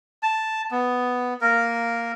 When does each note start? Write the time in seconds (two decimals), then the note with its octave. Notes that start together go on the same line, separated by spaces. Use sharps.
0.23 A5
0.71 B3
1.41 A#3 A#4